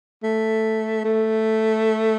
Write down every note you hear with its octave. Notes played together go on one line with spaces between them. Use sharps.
A3
A3